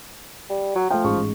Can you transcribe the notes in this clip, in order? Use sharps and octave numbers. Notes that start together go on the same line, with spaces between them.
G3
F#3
F3 A3 G5
A1 G#2 C#6